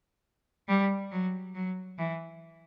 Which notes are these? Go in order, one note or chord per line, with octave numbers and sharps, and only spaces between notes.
G3
F#3
F#3
E3